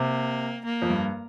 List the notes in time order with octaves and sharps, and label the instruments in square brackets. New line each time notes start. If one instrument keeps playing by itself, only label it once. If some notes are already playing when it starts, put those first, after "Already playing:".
Already playing: [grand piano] C3 [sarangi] A#3
[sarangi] A#3
[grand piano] F2
G2